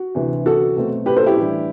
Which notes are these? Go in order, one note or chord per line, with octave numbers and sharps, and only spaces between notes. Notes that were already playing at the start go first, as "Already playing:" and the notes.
Already playing: F#4
D2 C3 E3
F#4 A4
B2 F#3 A3 C4
G4 B4
A4 C5
E4 G4
A2 E3 G3 D4